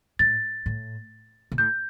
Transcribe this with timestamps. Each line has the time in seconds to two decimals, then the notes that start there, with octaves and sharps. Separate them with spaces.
0.19 A2 A6
0.66 A2
1.52 B2
1.58 A2 G6